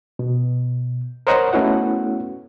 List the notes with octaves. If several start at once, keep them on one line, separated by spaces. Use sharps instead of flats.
B2
A#4 C5 C#5 D#5 F#5 A#5
A3 B3 C#4 E4 F#4 F#5